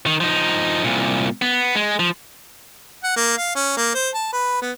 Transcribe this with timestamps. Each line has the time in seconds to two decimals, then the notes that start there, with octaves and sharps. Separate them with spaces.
0.06 D#3
0.20 F3 D#4
0.84 C2 A#2
1.42 B3
1.75 G#3
2.00 F3
3.04 F#5
3.16 A#3
3.38 F5
3.56 C#4
3.77 A#3
3.94 C5
4.14 A5
4.33 B4
4.62 B3